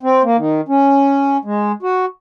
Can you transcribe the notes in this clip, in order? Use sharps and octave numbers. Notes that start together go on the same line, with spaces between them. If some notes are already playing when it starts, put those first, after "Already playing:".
C4
A#3
D#3
C#4
G#3
F#4